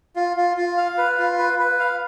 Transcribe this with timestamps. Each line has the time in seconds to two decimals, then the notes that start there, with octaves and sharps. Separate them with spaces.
0.16 F4
0.37 F4
0.57 F4
0.77 F5
0.98 B4
1.18 F4
1.38 B4
1.59 B4
1.79 F5